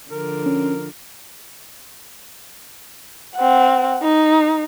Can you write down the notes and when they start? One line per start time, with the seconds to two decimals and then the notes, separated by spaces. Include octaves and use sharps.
0.11 D3 F3 A#4
0.46 C#4
3.36 C4 F#5
4.03 D#4